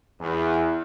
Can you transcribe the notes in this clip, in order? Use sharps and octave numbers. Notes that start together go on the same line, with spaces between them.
E2